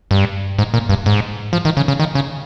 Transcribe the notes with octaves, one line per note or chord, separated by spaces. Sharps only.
G2
G#2
A#2
G2
G#2
F3
D#3
C#3
C#3
D#3
C#3